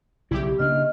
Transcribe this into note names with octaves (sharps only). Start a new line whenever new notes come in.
B1 C#3 G3 E4 G4
C#3 A#3 D4 D#5 F6